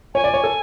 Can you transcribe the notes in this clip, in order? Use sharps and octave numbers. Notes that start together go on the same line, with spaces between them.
C#5 G#5
D5
C#5
A4